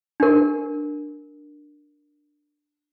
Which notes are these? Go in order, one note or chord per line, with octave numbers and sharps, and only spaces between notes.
D4 A#4